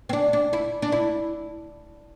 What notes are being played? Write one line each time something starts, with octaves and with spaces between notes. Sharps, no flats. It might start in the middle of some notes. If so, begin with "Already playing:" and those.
C4
D4
D4
E4
D4
E4